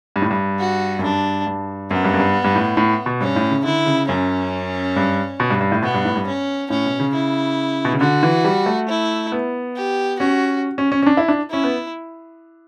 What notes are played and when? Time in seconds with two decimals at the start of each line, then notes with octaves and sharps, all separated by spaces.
0.16 G2
0.22 A2
0.30 G2
0.59 F#4
0.99 F#2
1.03 G2 D4
1.47 G2
1.90 F#2 B3
2.04 G2
2.14 F#2
2.20 G2
2.44 G2
2.55 A2
2.77 A2
3.06 B2
3.21 G2 C#4
3.36 A2
3.51 C#3
3.64 D3 E4
3.86 C#3
4.08 F#2 C#4
4.96 G2
5.40 B2
5.50 G2
5.61 G2
5.72 A2
5.82 B2 B3
5.94 G2
6.05 A2
6.16 G2
6.27 C#4
6.70 A2 C#4
6.85 B2
7.00 C#3
7.14 E4
7.85 B2
7.93 C#3
8.01 D3 F#4
8.23 E3
8.45 G3
8.66 A3
8.89 E4
9.32 B3
9.76 G4
10.20 C#4 F#4
10.78 C#4
10.92 C#4
11.02 C#4
11.06 D4
11.17 E4
11.28 D4
11.50 C#4 E4
11.64 B3